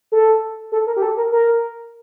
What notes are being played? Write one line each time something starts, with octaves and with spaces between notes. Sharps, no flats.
A4
A4
A#4
G4
A4
A#4
A#4